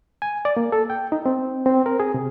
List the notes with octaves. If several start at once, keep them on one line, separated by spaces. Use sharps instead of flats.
G#5
D5
A#3
A4
G5
D#4
C4
C4
A#4
G#4
C3